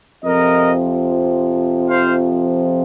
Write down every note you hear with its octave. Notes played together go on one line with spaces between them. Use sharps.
F2 C3 F3 A#4 D#5
C5 F5